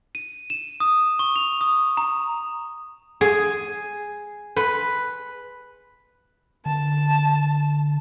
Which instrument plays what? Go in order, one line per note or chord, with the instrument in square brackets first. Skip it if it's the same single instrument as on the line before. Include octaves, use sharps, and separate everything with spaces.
[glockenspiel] D#7
E7
D#6
C#6
F7
D#6
A#5
[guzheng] G#4
B4
[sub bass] D3 [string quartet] A5